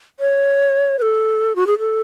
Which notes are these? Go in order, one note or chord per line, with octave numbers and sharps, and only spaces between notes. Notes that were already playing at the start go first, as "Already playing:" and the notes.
C#5
B4
A4
F#4
G#4
A4